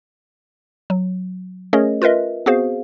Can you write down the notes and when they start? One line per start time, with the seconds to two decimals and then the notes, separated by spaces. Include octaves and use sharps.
0.90 F#3
1.73 A3 C#4 G#4 A#4 C#5 D#5
2.02 F4 A#4 B4 D#5 E5
2.46 B3 C4 F#4 G#4 C5 F5